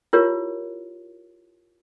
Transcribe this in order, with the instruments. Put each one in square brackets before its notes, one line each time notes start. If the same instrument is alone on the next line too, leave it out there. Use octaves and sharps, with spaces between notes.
[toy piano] E4 F4 G4 A#4 C#5